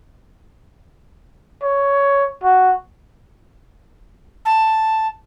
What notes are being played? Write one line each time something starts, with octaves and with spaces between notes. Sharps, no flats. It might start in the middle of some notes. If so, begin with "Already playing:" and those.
C#5
F#4
A5